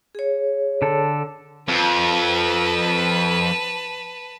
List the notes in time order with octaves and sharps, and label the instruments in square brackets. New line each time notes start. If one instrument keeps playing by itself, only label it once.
[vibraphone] G#4 C#5
[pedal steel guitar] D3 A4
[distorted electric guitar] F2 [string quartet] B4 A5